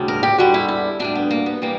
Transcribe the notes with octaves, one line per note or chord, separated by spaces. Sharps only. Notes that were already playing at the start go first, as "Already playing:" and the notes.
Already playing: D2 C#3 G3
A#4
G4
E2 D3 G3 F#4
E4
E4
D2 D3 G3 D4
B3
A#3
B3
E3 G3 A#3